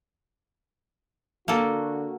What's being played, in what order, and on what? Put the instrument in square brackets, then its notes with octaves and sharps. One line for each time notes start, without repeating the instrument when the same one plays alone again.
[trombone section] D3 F#4 [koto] A#3 A4